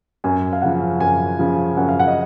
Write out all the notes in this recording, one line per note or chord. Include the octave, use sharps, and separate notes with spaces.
F#2 G#5
F5
C#3 F3 F#5
F#2 G#5
C#3 F3
F#2 F#5
F5
F#5
D#5